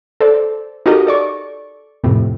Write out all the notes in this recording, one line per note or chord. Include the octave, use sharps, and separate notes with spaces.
A4 C5 D5
D#4 F#4 G4 A4 A#4 D#5
A4 D5 C#6
F2 A2 C3